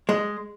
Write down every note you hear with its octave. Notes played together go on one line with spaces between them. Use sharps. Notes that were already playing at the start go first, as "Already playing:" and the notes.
G#3